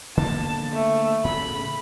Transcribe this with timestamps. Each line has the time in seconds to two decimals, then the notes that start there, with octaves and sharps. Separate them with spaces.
0.17 D3 A#3 B3 A5
0.73 A3
1.24 A2 C#3 B3 B5